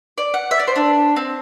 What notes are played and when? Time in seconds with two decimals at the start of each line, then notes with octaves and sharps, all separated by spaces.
0.18 D5
0.34 F#5
0.51 E5
0.60 D5
0.67 C5
0.76 D4
1.16 C4